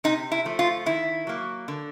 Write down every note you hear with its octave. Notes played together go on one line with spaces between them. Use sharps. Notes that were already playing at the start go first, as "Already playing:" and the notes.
C3 D#4
E4
F3 A3
F4
D#3 E4
F#3 A#3
D3